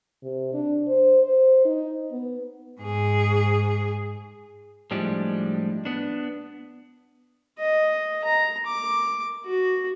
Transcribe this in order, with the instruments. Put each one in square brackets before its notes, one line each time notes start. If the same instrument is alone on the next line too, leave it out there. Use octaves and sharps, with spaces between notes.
[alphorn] C3
D4
C5
C5
D#4
B3
[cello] G#2 G#4
[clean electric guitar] A2 F3 G3 G#3 D4 G4
B3 D4
[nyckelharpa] D#5
A#5
D6
F#4